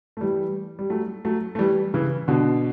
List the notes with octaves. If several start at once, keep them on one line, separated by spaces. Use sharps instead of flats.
A3
E3 G3
G3
F#3 A3
F#3 A3
A3
E3 G3
C#3 E3
B2 D3